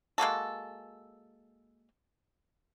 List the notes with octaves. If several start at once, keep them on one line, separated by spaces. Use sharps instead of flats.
G#3 A#3 F#4 A4